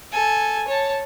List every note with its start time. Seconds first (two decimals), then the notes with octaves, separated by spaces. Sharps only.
0.12 A4 G#5
0.68 C#5 A5